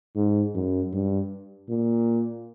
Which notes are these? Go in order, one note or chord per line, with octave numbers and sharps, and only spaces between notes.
G#2
F#2
G2
A#2